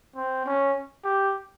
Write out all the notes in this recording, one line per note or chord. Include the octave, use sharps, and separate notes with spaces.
C4
C#4
G4